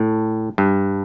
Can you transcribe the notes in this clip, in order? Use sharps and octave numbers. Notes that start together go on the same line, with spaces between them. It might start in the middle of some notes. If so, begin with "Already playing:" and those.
Already playing: A2
G2